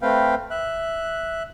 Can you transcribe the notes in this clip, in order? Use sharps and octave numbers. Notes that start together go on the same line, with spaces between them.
A3 C4 B4 F5 G5
E5 F#6